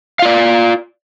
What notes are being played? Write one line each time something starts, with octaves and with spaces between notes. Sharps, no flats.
F4 D5 F5